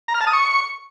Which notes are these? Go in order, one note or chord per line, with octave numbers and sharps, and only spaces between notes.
A#5
F6
A5
D#6
C#6